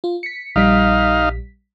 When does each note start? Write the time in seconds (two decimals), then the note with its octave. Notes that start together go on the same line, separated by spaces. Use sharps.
0.04 F4
0.23 B6 C#7
0.56 A#1 G3 D#4 F5 B6